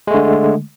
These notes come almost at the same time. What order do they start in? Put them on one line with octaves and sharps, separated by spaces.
G#3 A3 D3